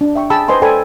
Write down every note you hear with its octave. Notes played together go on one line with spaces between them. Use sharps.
D4
E5 G5 C#6
G#4 G5 A5 B5 E6
B4 C5 D#5 G#5 C6
A4 C5 D5 G5 G#5 B5